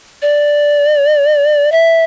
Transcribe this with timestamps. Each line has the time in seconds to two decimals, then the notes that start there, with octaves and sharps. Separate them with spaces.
0.22 D5
1.72 E5